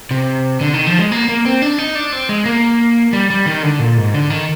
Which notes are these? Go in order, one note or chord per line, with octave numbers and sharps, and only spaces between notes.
C3
D3
D#3
F3
G#3
A#3
A#3
C4
D4
D#4
D4
C4
G#3
A#3
G3
G3
D#3
D3
A#2
G#2
D3
D#3